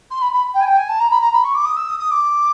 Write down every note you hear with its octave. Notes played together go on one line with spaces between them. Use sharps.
C6
B5
B5
G5
G#5
G5
G#5
A5
A#5
B5
A#5
B5
C#6
D6
D#6
E6
D#6
D#6
D6